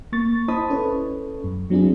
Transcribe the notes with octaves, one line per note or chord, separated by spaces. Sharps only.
A#3 C#6 A6
E4 C5 D#5 A5 B5 D#6
C#4 A4 B4 C#5
F#2
F#3 C4 D4 E4 G#4